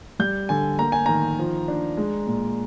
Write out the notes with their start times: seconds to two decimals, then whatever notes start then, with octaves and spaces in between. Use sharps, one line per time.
0.19 G3 G6
0.49 D3 G#5
0.79 A#3 A#5
0.92 G#5
1.06 D#3 A#5
1.39 F3
1.68 D4
1.97 G#3
2.27 A#2